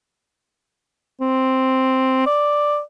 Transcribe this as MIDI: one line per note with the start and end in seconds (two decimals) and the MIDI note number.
1.21 2.24 60
2.26 2.80 74